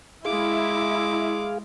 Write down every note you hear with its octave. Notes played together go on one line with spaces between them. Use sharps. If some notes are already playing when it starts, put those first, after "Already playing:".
G#3 E4 G#4 F5 D6